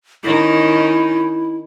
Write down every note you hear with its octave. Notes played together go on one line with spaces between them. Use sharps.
D#3 C#4 D#4 E4